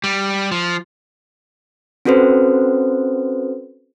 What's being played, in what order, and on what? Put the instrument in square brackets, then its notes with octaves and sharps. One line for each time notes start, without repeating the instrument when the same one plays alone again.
[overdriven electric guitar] G3
F3
[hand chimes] C4 C#4 F#4 A4 B4 C5